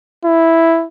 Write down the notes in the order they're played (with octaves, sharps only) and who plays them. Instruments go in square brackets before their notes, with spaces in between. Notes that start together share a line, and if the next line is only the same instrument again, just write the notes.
[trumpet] E4